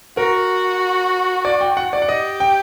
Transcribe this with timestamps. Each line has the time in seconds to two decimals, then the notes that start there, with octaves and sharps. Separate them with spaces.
0.17 F#4 A#4
1.45 D5
1.61 G5
1.77 F#5
1.93 D5
2.02 F#5
2.08 G4 D#5
2.40 G5